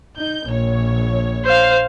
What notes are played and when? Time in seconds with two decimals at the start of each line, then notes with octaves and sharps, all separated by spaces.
0.19 D#4 G6
0.50 A#1 C#5
1.45 C5 F5